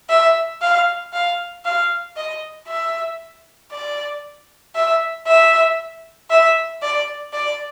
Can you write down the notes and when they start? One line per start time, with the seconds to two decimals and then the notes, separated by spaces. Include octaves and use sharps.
0.09 E5
0.61 F5
1.13 F5
1.65 F5
2.16 D#5
2.68 E5
3.72 D5
4.75 E5
5.27 E5
6.30 E5
6.82 D5
7.33 D5